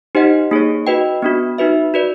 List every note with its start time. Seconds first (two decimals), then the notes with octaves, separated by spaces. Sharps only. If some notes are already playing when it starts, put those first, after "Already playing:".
0.15 D#4 G4 C5 D#5 F#5
0.51 A#3 D#4 G#4 C#5
0.87 F#4 B4 D#5 G5
1.22 B3 D4 F#4
1.58 D#4 F#4 B4 E5
1.94 F#4 B4 D5